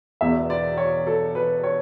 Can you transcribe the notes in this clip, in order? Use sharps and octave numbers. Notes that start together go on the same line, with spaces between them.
E1 E2 B2 E5
D5
C#5
A4
B4
C#5